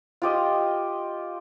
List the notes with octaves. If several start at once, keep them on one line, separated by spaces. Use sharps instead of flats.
F4 G4 D#5